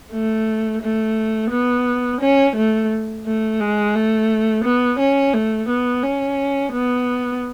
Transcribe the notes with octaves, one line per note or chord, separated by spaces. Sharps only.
A3
A3
B3
C#4
A3
A3
G#3
A3
B3
C#4
A3
B3
C#4
B3